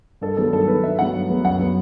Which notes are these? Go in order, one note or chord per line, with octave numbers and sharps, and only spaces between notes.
G2 A4
D#3 F#3 B3 A4
G2 A4
D#3 F#3 B3 B4
G2 E5
F#3 B3 F#5
G2
F#3 B3
F#2 F#5
F#3 B3